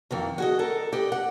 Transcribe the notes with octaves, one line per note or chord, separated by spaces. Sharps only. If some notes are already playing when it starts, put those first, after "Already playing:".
F2 D#3 E3
F#4 G#4 D#5
A4 A#4
G4 B4 D5 D#5
F#5